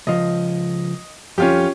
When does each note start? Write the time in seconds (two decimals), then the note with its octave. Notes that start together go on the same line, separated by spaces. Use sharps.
0.07 C#2 F3 D#5
1.38 F2 C#4 F4 G4